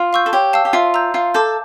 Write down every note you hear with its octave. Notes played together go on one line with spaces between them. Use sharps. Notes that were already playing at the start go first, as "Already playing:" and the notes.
Already playing: F4
F5 C#6 E6 G6
A4
G4 C#5
F5 A5 E6
G4
F4 E5
A#5 E6 G6
F4 F5
A4 A5 D6 G6